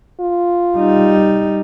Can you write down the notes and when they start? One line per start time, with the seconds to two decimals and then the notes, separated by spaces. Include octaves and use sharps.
0.20 F4
0.77 G3 D#4